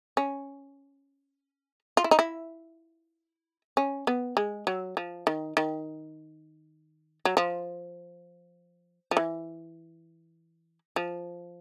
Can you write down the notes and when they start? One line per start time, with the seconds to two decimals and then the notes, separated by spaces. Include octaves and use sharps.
0.17 C#4
1.97 F4
2.04 E4
2.11 D#4
2.19 E4
3.77 C#4
4.07 B3
4.37 G#3
4.67 F#3
4.97 F3
5.27 D#3
5.57 D#3
7.25 F#3
7.37 F3
9.11 F3
9.17 E3
10.96 F3